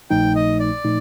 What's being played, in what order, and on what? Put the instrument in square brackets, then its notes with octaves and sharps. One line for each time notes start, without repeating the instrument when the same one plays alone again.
[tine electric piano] A#1 A#2 F3 A3 D#4 [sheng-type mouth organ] G5
[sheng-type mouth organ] D#5
D5
[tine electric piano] A#2 F3 A3 D#4